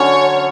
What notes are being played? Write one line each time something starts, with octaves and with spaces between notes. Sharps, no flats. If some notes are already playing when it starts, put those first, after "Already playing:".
Already playing: D3 F#3 C#4 C#5